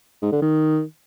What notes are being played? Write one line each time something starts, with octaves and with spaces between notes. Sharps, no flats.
G#2
D3
D#3